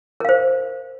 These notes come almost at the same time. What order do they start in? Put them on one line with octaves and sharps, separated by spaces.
A#4 F5 C5